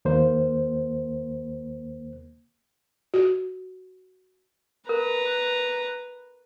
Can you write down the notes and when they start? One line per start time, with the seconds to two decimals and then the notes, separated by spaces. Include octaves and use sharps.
0.05 D#2 A#3 C5
3.14 F#4
4.89 A#4 B4 A#5